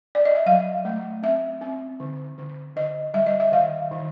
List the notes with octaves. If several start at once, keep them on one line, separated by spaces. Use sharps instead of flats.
D5
D#5
E5
F#3 F5
A3
C4 E5
C4
D3
D3
D3 D#5
G3 E5
D#5
E5
D#3 F5
D#3